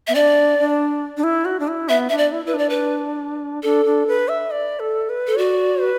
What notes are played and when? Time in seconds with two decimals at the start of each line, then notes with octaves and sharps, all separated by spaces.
0.07 B3 E5
0.15 D4 D5
0.58 D4
1.17 D4
1.23 E4
1.45 F#4
1.60 D4
1.68 E4
1.89 B3 E5
2.09 D4 E5
2.18 D5
2.32 E4
2.45 E4 B4
2.54 D4 D5
2.69 B4
3.63 D4 A4
3.85 D4
4.07 B4
4.28 E5
4.51 D5
4.80 A4
5.09 B4
5.27 A4
5.38 F#4 D5
5.82 B4